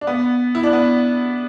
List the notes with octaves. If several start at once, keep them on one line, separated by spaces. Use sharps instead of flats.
D4
B3
E4
D4
B3